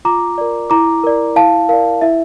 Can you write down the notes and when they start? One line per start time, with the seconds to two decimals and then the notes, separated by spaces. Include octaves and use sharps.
0.05 F4 A#5 D6
0.38 A#4 D5
0.70 E4 A#5 D6
1.03 A#4 D5
1.36 E4 F5 A5
1.69 A#4 D5 F5
2.02 E4 E5